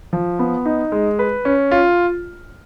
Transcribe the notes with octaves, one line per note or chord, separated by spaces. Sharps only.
F3
B3
D#4
G#3
B4
C#4
F4